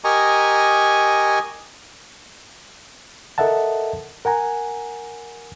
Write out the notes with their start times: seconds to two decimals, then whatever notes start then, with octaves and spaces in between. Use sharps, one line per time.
0.04 G4 A#4 D#5 G#5 A#5 C#6
3.38 A4 A#4 D#5 E5 F#5 A5
4.25 A#4 F#5 G#5 A#5